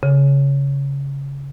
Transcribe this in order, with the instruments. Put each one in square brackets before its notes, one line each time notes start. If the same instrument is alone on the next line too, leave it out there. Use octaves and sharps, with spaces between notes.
[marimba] C#3